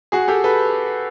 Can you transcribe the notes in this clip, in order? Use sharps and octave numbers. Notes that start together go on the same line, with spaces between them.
F#4 G#4
G4 A4
A4 B4